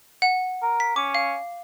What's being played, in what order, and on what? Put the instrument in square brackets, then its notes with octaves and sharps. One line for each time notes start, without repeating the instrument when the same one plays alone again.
[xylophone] F#5
[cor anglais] A#4
[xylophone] B6
[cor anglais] C#4 [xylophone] D6
[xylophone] F5